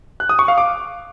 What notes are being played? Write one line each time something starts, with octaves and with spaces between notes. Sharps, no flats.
F#6
D#6
C#6
F5
D6